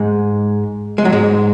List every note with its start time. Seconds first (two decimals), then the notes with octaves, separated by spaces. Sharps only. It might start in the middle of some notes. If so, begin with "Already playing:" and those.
Already playing: G#2 G#3
0.98 G#3
1.05 F#3
1.13 G#2 G#3